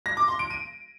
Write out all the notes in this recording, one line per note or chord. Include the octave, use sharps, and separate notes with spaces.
A#6
D6
C6
D7
D#7